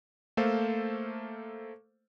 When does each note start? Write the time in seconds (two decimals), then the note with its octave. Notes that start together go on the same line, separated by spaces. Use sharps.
0.37 A3 A#3 A4 C5 F5